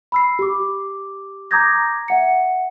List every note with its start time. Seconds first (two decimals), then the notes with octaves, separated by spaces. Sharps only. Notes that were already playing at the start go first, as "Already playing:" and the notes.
0.12 B5 E6 C7
0.39 G4 D6
1.51 A#5 D6 D#6 G6 G#6 A#6
2.08 E5 F#5 C#7